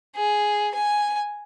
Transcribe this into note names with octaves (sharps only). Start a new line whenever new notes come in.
G#4
G#5